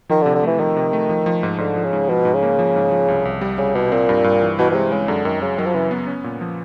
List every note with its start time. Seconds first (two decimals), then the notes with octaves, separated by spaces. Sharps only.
0.10 D#3 F3
0.22 D3
0.26 C3
0.35 D3
0.43 E3 A3
0.59 D#3 F3
0.76 C3
0.93 A3
1.09 F3
1.26 F3
1.43 G#2
1.58 G#2 D3
1.76 F3
1.84 C#3
1.93 G#2
2.09 B2 F3
2.25 G#2
2.34 C#3
2.43 A#3
2.59 F3
2.76 G#2
2.91 F3
3.08 C2
3.25 C2
3.41 G3
3.58 C#3 G3
3.75 C2 B2
3.92 A#2 C4
4.09 G2
4.24 G2
4.41 E3
4.59 B2 E3
4.71 B2
4.75 C3 G#3
4.92 C#3 G#3
5.08 F#2 D3
5.25 F#2 D#3
5.41 C#3 F#3
5.58 D#3 F#3
5.66 F3
5.74 C#3 E3
5.91 B3
6.07 C#4
6.24 A#2
6.41 F3